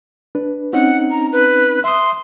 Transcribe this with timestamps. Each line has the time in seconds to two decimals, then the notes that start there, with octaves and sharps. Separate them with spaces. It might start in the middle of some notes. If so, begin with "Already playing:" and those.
0.35 D4 B4
0.73 C4 C#4 D#4 F#5
1.11 A#5
1.32 B4
1.84 E5 C6 D#6